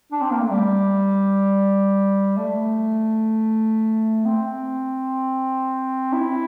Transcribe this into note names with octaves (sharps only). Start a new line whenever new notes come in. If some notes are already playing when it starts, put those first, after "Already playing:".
D4
C4
A#3
A3
G3
A3
C4
E4